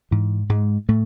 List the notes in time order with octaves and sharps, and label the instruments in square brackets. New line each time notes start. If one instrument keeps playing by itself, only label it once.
[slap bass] G#2 E3
G#2 G#3
A2 A3